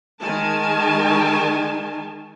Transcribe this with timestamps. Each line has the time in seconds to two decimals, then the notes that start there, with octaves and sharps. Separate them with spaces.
0.21 D#3 G#3 A#4 G#5 A5